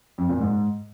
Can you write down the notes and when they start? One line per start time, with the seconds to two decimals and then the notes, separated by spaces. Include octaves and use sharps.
0.18 F2
0.29 A#2
0.40 G#2